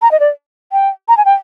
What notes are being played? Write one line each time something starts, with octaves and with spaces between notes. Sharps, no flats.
A#5
D#5
D5
G5
A#5
G#5
G5